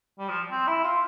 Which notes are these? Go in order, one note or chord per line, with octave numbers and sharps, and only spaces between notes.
G3
F3
C4
E4
F4